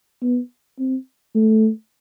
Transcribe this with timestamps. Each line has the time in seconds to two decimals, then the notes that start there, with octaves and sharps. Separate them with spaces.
0.22 B3
0.79 C4
1.35 A3